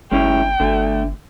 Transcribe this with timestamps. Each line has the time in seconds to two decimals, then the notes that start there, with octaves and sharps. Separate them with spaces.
0.12 G1 G#3 C#4 E4 G5
0.60 G1 D3 A3